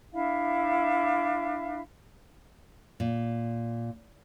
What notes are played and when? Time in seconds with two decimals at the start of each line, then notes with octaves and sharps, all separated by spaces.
0.13 D4 E4 E5 F5
3.00 A#2